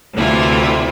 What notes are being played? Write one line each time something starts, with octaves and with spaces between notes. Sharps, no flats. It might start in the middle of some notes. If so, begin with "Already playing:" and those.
D2 C3 E3 E4 F4 G#5